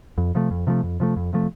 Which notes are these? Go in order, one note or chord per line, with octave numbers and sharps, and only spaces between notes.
F2
C3 F3 A3
F2
C3 F3 A3
F2
C3 F3 A3
F2
C3 F3 A3